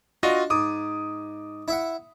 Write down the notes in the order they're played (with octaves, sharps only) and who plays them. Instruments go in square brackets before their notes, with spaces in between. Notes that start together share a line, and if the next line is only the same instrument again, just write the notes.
[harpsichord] D4 [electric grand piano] F4 F#4 D#5
[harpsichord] G#2 [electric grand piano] D6 D#6
[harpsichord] E4 E5 F#5